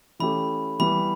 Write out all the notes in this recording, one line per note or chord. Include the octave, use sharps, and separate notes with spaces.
E3 A3 C#4 G4 B5
E3 G3 B3 B5